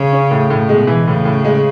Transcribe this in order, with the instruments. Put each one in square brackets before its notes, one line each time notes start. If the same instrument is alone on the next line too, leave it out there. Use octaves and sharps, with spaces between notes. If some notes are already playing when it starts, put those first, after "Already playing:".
Already playing: [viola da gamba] C#3
[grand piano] C#4
A2
A2
[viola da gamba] B2 [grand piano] G#3
[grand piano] E3
[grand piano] A2 [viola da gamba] C#3
[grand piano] A2
G#3